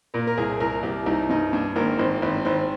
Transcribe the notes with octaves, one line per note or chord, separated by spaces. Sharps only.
A#2 A#4
A#4
C2 G#4
C2 A#4
C2 G4
C2 D#4
G2 D#4
G2 D4
G#1 A#3
G#1 C4
G#1 C4
G#1 C4